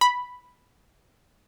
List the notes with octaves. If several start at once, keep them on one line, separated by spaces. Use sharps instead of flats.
B5